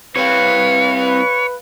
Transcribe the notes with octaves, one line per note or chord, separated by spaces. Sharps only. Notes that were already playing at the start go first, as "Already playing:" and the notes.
C2 C4 B4 C#5 F5